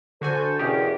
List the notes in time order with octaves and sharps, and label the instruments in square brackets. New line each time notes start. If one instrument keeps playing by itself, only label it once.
[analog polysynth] D3 F#4 G#5 [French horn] A4 [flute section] C5 A5 G6
[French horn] E2 [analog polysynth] B2 C#4 G#4 [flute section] F4 A#4 E5 [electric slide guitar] G4